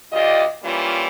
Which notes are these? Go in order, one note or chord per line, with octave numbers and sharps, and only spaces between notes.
D2 F4 G4 D5 D#5
E3 G3 A#3 C#4 F4